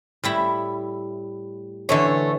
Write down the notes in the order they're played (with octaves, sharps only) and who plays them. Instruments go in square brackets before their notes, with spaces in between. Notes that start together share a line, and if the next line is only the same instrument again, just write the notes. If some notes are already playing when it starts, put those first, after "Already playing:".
[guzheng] A2 G3 E4
[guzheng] D3 E3 [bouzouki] A3 C#5